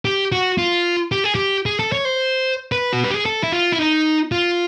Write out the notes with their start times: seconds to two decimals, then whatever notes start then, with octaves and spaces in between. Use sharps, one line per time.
0.05 G4
0.32 F#4
0.58 F4
1.12 G4
1.24 G#4
1.35 G4
1.66 G#4
1.79 A4
1.92 C#5
2.05 C5
2.72 B4
2.93 F#4
3.04 G4
3.14 G#4
3.26 A4
3.43 E4
3.52 F4
3.72 E4
3.79 D#4
4.32 F4